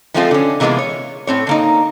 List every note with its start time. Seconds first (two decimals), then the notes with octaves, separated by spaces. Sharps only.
0.14 F3 G#3 A3 C4 E4 F4
0.31 D3 C#4
0.60 C3 E3 G#3 A#3 B3 F4
0.79 C#5
1.27 A2 C4 C#5
1.47 D3 A#3 D#4